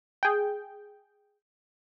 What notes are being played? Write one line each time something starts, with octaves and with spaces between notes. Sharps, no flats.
G#4 G5